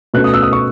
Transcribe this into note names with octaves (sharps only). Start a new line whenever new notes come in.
B2 A3 C#4 F#6
D#6
E6
D#6
C#6